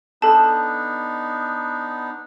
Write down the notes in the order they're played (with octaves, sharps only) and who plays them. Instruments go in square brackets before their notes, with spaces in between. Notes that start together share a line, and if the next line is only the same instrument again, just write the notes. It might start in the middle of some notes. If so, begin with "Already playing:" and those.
[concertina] B3 D4 D#4 [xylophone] A4 A5